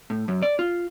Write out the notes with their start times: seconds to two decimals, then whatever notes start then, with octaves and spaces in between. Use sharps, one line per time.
0.10 A2
0.28 F#2
0.42 D5
0.59 F4